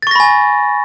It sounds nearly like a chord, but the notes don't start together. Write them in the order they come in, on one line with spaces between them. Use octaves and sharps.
A6 C#6 A#6 B5 G#5